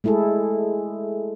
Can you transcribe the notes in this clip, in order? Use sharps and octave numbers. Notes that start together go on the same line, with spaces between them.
G#3 A3 E4 G#4 A4